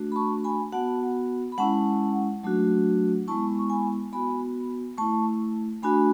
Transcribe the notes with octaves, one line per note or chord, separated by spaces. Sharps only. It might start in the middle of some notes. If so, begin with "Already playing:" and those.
Already playing: A3 D4 F#4
B5
A5 C#6
G#5 B5
B3 F#4 F#5 A5
B5
G#3 C#4 E4 F#5 A5
F#3 A3 D4 F#4
G#3 B3 E4 A5 C#6
C#6
G#5 B5
B3 F#4 G#5 B5
A3 E4 A5 C#6
A3 D4 F#4 G#5 B5